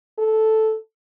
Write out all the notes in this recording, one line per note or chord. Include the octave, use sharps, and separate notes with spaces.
A4